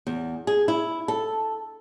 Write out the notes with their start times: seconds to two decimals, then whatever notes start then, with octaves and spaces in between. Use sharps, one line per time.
0.07 E2
0.47 G#4
0.68 E4
1.08 A4